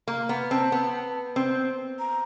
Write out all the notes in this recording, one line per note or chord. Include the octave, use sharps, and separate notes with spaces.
A#3 A#5
B3 A#5
C4 A5
B3
C4
A#5